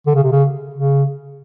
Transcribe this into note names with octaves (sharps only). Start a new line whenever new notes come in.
D3
C#3
C3
C#3
C#3